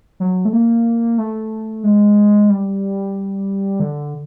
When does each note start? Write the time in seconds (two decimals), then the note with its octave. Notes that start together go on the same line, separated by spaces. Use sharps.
0.20 F#3
0.45 A3
0.53 A#3
1.18 A3
1.83 G#3
2.49 G3
3.80 D3